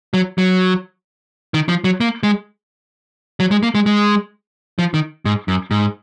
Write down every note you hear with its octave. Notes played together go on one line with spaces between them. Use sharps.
F#3
F#3
D#3
F3
F#3
A#3
G#3
F#3
G#3
A#3
G#3
G#3
F3
D#3
G#2
F#2
G#2